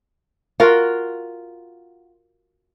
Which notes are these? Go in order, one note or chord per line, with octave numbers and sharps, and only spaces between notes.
F4 F#4 A#4 F#5